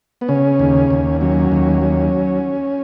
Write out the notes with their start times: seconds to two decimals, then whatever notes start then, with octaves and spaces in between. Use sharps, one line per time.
0.21 B3
0.28 C#3 C#4
0.59 D#2
0.90 D#2
1.21 F#3 C#4
1.52 D#2
1.82 F#3